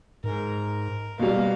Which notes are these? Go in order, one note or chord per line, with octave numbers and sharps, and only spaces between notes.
G#2 A#4
B2 G3 A#3 F5